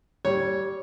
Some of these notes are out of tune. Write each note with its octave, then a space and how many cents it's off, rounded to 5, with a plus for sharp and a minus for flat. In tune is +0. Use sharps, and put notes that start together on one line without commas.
G3 -15 C#5 +0